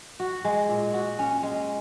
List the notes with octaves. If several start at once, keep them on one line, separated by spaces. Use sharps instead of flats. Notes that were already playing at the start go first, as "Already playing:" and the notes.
F#4
G#3
A#2
F#4
C#4
G#3